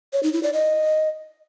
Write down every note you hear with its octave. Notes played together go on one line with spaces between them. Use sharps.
C#5
D#4
E4
D5
D#5